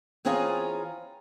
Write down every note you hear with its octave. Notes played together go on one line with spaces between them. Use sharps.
E3 C4 C#4 F4 G#4 A#5